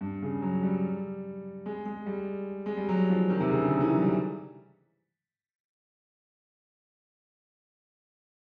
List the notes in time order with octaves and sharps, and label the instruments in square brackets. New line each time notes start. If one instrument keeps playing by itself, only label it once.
[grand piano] G2
C#3
F#3
G3
G#3
G#3
G3
G#3
G3
F#3
F3
D#3
C3
C#3
D3
D#3
E3
F#3
G3